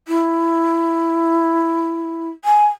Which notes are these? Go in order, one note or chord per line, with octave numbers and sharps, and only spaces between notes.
E4
G#5